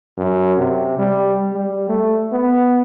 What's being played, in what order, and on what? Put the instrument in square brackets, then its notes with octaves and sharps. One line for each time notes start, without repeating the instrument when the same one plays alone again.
[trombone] F#2
C3
G3
G3
A3
B3